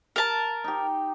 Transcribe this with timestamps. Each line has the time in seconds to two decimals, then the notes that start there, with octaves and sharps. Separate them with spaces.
0.16 A#4 A5
0.64 D#4 G4